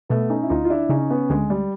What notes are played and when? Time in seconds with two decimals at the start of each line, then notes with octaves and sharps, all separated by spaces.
0.09 B2 A3 B3
0.30 C#4 D#4
0.43 E4
0.50 D2 D#4 F4
0.65 F4
0.70 D4 E4
0.89 C#3 C#4 D#4
1.10 B3 C#4
1.29 D2 G#3
1.50 G3